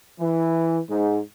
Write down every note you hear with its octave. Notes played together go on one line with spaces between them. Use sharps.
E3
G#2